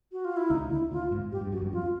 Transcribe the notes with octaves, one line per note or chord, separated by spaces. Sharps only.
F#4
F4
E4
C#2 C#3 D#4
C#3
D2 D3 E4
D2 D3 F4
G#1 G#2
G#2 G4
G2
F#2 F#4
G1 G2
F2 F4